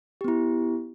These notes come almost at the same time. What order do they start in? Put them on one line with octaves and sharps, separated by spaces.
G4 B3 E4